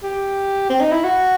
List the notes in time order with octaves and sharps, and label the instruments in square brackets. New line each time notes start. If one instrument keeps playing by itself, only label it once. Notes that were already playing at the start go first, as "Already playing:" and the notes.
[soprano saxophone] G4
C4
D#4
E4
F#4